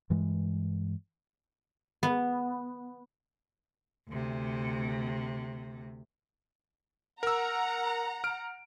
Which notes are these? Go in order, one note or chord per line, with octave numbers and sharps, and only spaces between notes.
G2 E3 G#3
B3
D2 C3
A#4 F#5 A#5 E6
F6 D7